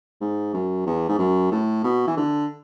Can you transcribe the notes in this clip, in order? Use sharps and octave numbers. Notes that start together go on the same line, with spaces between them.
G#2
F#2
E2
G#2
F#2
A2
B2
E3
D3